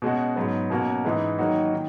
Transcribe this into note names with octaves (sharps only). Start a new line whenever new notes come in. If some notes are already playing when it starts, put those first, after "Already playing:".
B2 G#3 C#4 F#4
G#2 F#3 B3
B2 A#3 C#4 F#4
G#2 E3 G#3 D#4
D#3 F#3 A#3 D#4 F#4
D#3